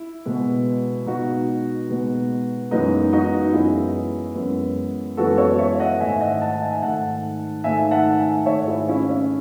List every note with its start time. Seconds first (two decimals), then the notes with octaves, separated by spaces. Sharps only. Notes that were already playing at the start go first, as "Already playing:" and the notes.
Already playing: E4
0.25 B2 G#3 B3
1.06 B2 G#3 B3 D#4 F#4
1.89 B2 G#3 B3
2.71 F#2 E3 G#3 B3 D#4
3.12 D#4 F#4
3.53 F#2 E3 G#3 B3 E4 G#4
4.35 F#2 E3 G#3 B3
5.17 F#2 E3 G#3 B3 F#4 A4
5.38 A4 C#5
5.58 C#5 E5
5.75 E5
5.80 D#5 F#5
6.00 G#2 D#3 A3 E5 G#5
6.21 D#5 F#5
6.41 F#5 A5
6.62 E5 G#5
6.82 G#2 D#3 A3 F#5 A5
7.64 G#2 D#3 A3 E5 G#5
7.91 F#5 A5
8.19 E5 G#5
8.46 G#2 D#3 A3 C#5 E5
8.67 E4 G#4
8.88 C#4 E4
9.08 C#4